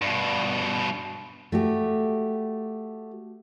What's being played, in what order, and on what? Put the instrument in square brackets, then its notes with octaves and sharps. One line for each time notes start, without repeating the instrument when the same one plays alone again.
[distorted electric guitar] G2 B2
[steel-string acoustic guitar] A3 F#4 G4